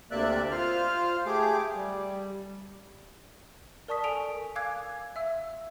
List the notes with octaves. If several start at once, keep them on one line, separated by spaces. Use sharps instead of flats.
D2 C3 A#3 D5 E5 F#6
F4 C5 F6
A3 G4 G#4 D6
G3
A#4 D5 A5 C#6 D#6 B6
A4 G#5 D7 F7
F5 G#5 D6 E6 F#6 G#6
E5 E6